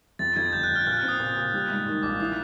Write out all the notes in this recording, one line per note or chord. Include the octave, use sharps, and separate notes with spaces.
F2 A6
F2 G#6
G1 G6
F#6
G1
F6
A#2 F6
F#6
F6
C4
D#6
A#2
A#2
G3
G#2
D#3
A#1 D6
E3 D#6